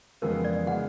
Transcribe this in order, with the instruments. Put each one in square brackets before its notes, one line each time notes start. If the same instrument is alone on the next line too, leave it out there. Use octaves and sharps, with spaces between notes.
[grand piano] F2 C#3 E3 G#3 B3 [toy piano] A#4
[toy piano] D5
[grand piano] C#3 E3 G#3 B3 [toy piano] F#5